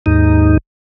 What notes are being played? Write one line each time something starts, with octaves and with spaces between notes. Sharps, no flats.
D#2 G#2 D#4